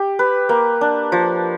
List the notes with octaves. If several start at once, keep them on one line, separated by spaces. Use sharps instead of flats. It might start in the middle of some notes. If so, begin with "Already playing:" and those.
Already playing: G4
B4
A#3
D4
F3